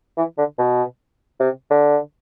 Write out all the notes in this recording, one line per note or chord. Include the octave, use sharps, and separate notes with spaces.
E3
D3
B2
C3
D3